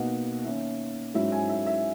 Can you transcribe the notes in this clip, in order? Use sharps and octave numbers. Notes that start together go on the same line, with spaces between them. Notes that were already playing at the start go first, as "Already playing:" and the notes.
Already playing: B2 A#3 D#4 D#5 F#5
D#3 A#3 C#4 E5
G#2 F#3 C#4 E4 E5
E5 G#5
E5
E5